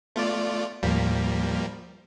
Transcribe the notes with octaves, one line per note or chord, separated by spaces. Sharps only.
A3 B3 F4 D5
D#2 A2 F3 G3 A#3 B6